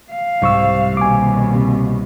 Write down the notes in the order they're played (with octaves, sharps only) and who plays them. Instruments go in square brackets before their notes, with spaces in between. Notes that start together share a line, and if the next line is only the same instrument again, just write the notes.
[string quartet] F5
[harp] C2 [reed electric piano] G#2 C#6 E6
[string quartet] D#2 B2 [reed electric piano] G#5 D6
[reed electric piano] C3